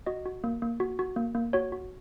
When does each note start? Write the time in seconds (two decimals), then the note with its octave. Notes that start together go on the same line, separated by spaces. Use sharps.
0.06 F#4 D#5
0.26 F#4
0.44 A#3
0.62 A#3
0.80 F#4
0.99 F#4
1.16 A#3
1.35 A#3
1.53 F#4 C#5
1.72 F#4